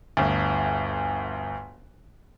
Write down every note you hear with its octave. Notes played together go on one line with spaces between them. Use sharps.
G1 D2